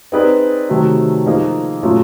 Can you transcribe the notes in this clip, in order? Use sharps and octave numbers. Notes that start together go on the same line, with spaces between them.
C4 D#4 G#4 B4 D5
C3 D#3 F#3 A3
F3 A#3 D#4 G#4
A#2 F#3 A3 C#4 F4